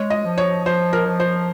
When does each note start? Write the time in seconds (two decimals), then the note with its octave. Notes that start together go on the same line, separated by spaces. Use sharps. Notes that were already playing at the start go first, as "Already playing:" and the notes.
Already playing: G#3 C#5
0.10 D#5
0.25 F3
0.38 C#5
0.65 F3 C5
0.93 A#4
1.06 F3
1.20 C5